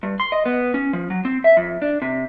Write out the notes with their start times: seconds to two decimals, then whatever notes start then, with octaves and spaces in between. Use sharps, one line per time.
0.03 G2
0.20 C6
0.32 D#5
0.46 B3
0.74 C#4
0.93 F3
1.10 F#3
1.25 C4
1.44 E5
1.57 F2
1.82 D4
2.02 C3